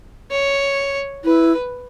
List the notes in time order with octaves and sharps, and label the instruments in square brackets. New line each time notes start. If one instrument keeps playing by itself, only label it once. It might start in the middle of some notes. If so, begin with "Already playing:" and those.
[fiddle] C#5
[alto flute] E4 [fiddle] B4